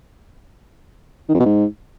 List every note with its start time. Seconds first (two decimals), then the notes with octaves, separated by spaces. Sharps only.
1.29 D#3
1.34 F2
1.40 B2
1.45 G#2